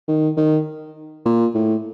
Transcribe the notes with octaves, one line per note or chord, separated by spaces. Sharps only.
D#3
D#3
A#2
A2